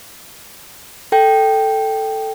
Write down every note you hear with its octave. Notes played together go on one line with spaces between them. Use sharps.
A4 G5